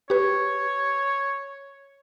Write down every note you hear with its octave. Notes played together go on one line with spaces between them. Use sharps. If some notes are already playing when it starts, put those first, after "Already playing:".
G4 B4 C#5